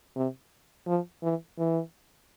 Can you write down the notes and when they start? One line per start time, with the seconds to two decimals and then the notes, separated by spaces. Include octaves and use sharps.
0.16 C3
0.87 F3
1.23 E3
1.58 E3